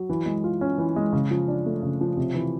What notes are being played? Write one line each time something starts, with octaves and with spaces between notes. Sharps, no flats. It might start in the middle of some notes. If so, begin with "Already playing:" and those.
Already playing: F#3
E3
G#3
F4
C#4
E3
G#3
C#3
F3
D4
A3
C#3
F3
C3
E3